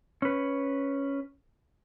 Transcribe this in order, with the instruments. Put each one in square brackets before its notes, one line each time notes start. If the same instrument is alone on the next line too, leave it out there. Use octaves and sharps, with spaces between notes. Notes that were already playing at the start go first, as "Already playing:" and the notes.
[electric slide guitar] C#4 B4